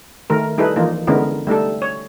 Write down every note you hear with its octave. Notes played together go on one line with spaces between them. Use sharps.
D#3 A3 A#4
G3 D#4 E4 G#4 A4 B4
E3 F3 A#3 D#4 F4
D3 G#3 B3 C#4 E4 A#4
G3 A3 D#4 A4
C#5